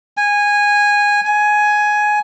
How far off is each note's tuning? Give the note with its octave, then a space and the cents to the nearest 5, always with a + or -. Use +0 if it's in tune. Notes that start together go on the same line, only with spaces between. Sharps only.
G#5 -15
G#5 +10